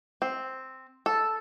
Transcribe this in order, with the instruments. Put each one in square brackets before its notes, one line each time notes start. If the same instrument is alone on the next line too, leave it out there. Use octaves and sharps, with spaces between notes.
[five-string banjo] C4
A4